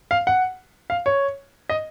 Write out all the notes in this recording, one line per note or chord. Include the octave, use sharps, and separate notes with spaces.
F5
F#5
F5
C#5
D#5